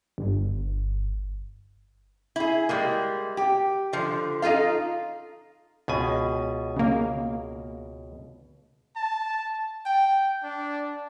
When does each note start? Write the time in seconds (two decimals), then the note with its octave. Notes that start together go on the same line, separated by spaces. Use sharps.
0.18 G1
2.36 E4 G#4
2.69 G3 G#3 A#3
3.37 G4
3.93 D3 F3
4.42 D#4 F4 A4 F5
5.88 C#2 B2 G#5
6.76 C#3 A#3
8.96 A5
9.86 G5
10.44 D4